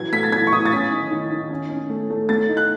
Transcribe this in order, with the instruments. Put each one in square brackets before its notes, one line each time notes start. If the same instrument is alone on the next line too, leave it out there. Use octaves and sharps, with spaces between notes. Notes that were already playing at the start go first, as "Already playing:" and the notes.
Already playing: [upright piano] E3 F#3 G#6
A3 B6
A6
E3 G#6
C#6
E4 D#6
A6
C#4 B6
D#3
D#3
D#3
C#4
C#4
A3
A3
A3 A6
D#4
F#6